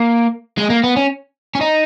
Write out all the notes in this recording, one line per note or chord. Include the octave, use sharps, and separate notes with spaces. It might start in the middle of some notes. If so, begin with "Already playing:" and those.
Already playing: A#3
G#3
A#3
B3
C#4
C#4
D#4